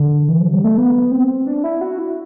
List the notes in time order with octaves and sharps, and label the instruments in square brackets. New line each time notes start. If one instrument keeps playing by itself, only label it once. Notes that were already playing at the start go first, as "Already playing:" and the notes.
Already playing: [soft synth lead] D3
E3
F#3
G3
A3
B3
C4
D4
E4
F#4
E4